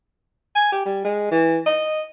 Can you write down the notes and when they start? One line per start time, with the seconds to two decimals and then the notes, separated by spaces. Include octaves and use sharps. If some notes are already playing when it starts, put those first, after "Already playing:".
0.56 G#5
0.72 G4
0.86 G3
1.05 G#3
1.31 E3
1.66 D#5